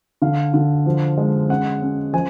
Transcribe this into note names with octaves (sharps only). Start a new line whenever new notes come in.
D3 F5
D3
F3
G#3
C#4 F#5
C#4
F3 G#5